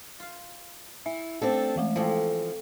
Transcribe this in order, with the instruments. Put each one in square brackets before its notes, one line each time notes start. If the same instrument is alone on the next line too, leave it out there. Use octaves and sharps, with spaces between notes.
[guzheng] F4 F5
[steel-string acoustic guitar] E4 [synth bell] E5
[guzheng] G3 [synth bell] A3 [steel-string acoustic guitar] C4 D4 A4
[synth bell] E3 G#3 A3
[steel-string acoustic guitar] E3 F3 [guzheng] A3 C4 [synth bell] F5